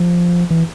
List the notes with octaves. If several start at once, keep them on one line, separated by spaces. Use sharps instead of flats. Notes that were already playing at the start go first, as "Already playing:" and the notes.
Already playing: F3
E3